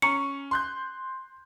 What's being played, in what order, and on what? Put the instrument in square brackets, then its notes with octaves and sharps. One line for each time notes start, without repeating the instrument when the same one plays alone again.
[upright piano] C#4 [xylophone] A#5 C#6 C#7
[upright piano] C6 F#6 G6